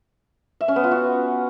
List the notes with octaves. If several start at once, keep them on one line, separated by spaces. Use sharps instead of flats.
E5
C#4
B3
F4
F#4